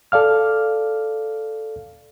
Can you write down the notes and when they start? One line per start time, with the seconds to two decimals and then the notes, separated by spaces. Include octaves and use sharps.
0.12 A4 D5 F5 F6